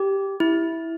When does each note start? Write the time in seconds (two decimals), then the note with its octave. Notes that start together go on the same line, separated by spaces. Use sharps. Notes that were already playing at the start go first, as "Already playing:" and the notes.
Already playing: G4
0.40 E4